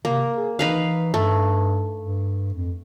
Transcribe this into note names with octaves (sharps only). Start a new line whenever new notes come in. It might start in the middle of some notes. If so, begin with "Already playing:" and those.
C3 A#3
G#4
E3 D#4 B4 F5
G2 A3
G2
F2